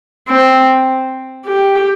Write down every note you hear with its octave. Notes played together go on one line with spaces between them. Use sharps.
C4
G4